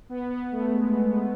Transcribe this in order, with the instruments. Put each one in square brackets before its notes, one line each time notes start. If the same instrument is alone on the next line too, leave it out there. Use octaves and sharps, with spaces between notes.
[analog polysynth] B3
B3
A3
G#3